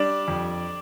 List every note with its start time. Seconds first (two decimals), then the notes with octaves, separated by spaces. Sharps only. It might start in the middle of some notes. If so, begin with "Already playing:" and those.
Already playing: G3 D4 D5
0.28 F2